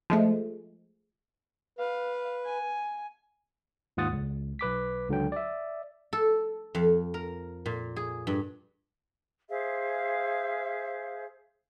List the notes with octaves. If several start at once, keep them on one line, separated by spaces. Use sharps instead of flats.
F3 G#3 A3
B4 F5
G#5
D#2 G#2 F4 F#5 D#6 A6
C#2
B1 B4 D6 B6
C#2 D3 F#3 G5
D5 E5
A4
F2
A#4
A#2
G#4
G2
G#4 C5 E5 F5